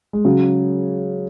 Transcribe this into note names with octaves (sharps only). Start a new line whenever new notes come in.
G#3
C#3 F#3